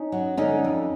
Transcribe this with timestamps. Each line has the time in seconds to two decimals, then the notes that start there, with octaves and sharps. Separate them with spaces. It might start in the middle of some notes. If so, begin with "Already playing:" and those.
Already playing: C#4 D#4
0.12 F#3
0.37 D3 C#4 D#4
0.64 F2